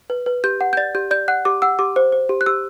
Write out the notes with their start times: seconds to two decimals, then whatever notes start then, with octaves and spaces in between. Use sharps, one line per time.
0.10 B4
0.26 B4
0.44 G4 G6
0.61 F#5
0.73 G6
0.77 D5 A6
0.95 G4 G6
1.11 D5 G6
1.28 F#5 F#6
1.45 G4 D6
1.62 F#5 E6
1.79 G4 D6
1.96 C5
2.12 C5
2.29 G4
2.41 F#6
2.46 G4 E6